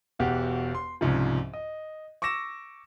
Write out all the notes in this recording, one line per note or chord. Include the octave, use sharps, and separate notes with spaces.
E1 E2 F#4 G4
C6
C2 G#2 C#3 F3
D#5
C#6 D6 E6 A#6 E7